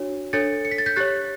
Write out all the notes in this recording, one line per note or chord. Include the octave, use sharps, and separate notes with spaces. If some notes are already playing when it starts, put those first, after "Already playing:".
Already playing: D4 F#4 C#5
D4 A4 C#5 A6 C#7
C#7
B6
A6
G6 B6
G4 C#5 F#6 A6